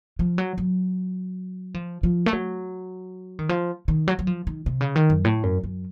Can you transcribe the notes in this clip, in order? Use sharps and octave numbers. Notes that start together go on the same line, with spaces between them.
F3
F#3
F#3
F3
F3
A3
F#3
D#3
F3
D#3
F#3
F#3
F3
D#3
C3
C#3
D#3
F#2
A2
F#2
F#2